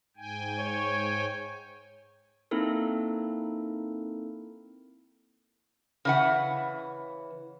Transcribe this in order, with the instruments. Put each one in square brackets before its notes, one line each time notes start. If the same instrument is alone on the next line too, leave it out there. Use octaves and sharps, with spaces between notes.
[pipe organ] G#2 G5 G#5
[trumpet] C#5
[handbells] A#3 C4 D#4 E4 A4 A#4
[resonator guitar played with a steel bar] C#3 E3 F#5